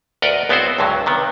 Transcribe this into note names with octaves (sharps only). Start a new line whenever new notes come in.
D2 A#4 B4 D5 D#5 F#5
C#2 B3 C4 E4 F#4 C5
C#2 G2 D3 F#3
C3 D#3 B3